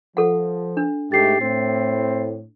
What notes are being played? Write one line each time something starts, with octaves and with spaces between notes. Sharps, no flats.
F3 A4 F#5
D4
G#2 A3 G4 A6 C7
A2 C4